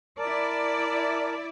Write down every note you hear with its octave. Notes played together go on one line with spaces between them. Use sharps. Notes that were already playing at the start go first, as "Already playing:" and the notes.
E4 A#4 D5 A5